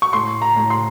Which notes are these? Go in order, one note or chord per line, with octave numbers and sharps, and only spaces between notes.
C#6
A2 C6
A#5
A2
C6